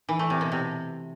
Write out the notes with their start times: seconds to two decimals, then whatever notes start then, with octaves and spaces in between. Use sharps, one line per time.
0.09 E3
0.19 A3
0.30 C3
0.41 B2
0.52 C3